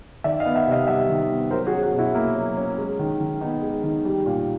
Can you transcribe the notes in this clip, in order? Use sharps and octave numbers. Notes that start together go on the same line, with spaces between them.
D#3 D5 E5
D#5 F5
B3
E5 F#5
C3
D#5 F5
G3 E5 F#5
D#3
B3
F#3 A#4 C5
F#4 G#4
C#4
F#4 G#4
B2
E4 F#4
A#3 E4
F#3
C#4
G#3
D#3
D#3
B3 D#4
G#3
D#3
G3
A#2